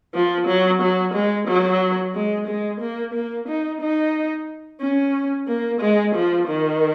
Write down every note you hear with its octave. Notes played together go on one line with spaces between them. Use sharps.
F3
F#3
F#3
G#3
F#3
G#3
G#3
A#3
A#3
D#4
D#4
C#4
A#3
G#3
F3
D#3